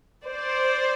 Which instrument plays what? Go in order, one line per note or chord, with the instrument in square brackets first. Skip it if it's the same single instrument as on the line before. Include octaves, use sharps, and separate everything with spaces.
[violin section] C5 D5